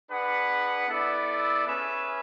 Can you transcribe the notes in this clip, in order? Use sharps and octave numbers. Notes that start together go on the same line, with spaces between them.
D4 G#4 B4 F#5
B3 E4 A4 D5
C#4 G#4 B4 E5